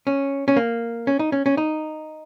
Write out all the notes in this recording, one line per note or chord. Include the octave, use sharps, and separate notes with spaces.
C#4
C#4
A#3
C#4
D#4
C#4
C#4
D#4